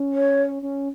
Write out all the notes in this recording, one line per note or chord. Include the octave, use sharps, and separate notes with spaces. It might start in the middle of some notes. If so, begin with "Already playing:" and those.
Already playing: C#4
C#5
C#4